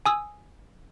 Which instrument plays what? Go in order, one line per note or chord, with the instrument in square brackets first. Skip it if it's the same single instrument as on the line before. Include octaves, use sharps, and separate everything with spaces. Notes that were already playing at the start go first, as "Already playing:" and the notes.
[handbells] G#5 D#6 E6